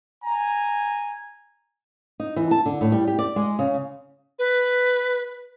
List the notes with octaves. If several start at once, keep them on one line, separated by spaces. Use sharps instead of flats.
G#5 A#5
D#4
E3
A5
D3
A2
G3
G4
D5
G#3
C#3
B4